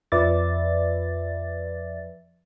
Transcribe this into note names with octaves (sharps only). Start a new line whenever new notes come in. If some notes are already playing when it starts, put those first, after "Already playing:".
F2 F3 B4 D5 E5 A6